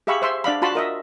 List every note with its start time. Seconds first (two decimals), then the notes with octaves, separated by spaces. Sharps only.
0.07 G4 G#4 E5 F5 B5 C#6
0.22 C5 E5 C6
0.44 D4 D5 F5 B5
0.62 F4 F#4 A5 B5 C6
0.75 A#4 D#5 E5